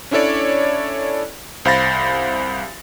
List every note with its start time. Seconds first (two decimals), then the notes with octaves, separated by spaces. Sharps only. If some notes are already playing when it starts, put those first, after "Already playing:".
0.11 C#4 D4 E4 A4 C#5 D5
1.65 C2 C5 F5 B5 A6 A#6